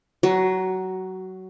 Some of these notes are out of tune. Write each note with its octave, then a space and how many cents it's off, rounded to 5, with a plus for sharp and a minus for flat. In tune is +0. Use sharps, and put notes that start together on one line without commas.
F#3 +20 F#4 +0